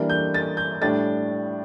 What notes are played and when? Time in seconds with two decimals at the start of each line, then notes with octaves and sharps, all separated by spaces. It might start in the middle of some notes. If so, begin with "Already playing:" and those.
Already playing: E3 G3 A#3 D4
0.10 G6
0.34 A6
0.57 G6
0.81 A2 G3 D4 A6